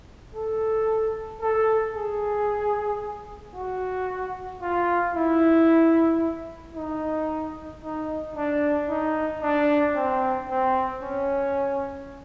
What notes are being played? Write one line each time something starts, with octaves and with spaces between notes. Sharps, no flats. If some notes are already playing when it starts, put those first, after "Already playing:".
A4
A4
G#4
F#4
F4
E4
D#4
D#4
D4
D#4
D4
C4
C4
C#4